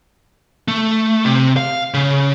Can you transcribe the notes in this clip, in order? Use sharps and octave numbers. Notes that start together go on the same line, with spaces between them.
A3
C3
F5
C#3